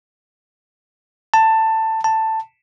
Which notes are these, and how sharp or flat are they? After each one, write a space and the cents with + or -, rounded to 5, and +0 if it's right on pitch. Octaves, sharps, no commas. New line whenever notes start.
A5 +15
A5 +10